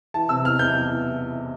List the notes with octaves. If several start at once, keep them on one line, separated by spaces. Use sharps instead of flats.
E3 A5
C3 E6
E2 F6
E2 G6
E3